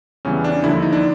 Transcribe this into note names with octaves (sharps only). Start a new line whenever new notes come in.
E2 C#3 E3 G3 C#4
D4
D#2 D3 F3 E4
E4
D#4
D4